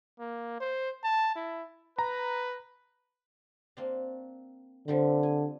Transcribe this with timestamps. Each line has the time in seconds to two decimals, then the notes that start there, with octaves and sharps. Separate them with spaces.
0.19 A#3
0.60 C5
1.04 A5
1.36 E4
1.99 B4 A#5
3.77 A#3 C4 D4
4.88 D3 F3 G3 C4
5.23 G#5